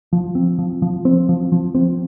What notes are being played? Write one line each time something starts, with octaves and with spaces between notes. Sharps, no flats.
F3
C4
F3
F3
C4
F3
F3
C4